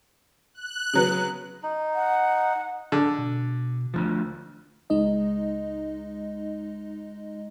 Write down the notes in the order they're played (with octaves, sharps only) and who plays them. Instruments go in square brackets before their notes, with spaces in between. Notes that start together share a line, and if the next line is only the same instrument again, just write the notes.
[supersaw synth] F#6
[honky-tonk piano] C#3 F#3 B3
[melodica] D#4
[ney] F#5
[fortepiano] D3
[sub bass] B2
[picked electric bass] D2 F3
[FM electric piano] C#2 G#3 D#4 D#5